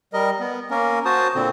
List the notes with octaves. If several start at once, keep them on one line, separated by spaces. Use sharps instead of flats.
G3 A#4 D#5
B3
A#3 C#4 A#4
F#4 C5 A5 D#6
A#2 D3 C4